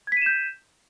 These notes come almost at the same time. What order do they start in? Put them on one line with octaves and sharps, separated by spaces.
G#6 B6 D#7 E7 G6